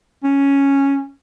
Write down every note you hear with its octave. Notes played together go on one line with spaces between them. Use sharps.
C#4